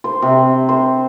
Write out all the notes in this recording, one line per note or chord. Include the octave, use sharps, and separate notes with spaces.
C5
C3
C5